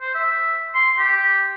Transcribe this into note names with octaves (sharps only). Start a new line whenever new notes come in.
C5
E5
C6
G4